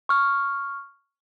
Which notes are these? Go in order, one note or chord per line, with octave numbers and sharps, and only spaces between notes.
C#6 F6